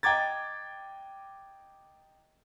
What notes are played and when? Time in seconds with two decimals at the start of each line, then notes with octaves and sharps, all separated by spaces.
0.03 D#5 G5 A#5 D6 G#6 A6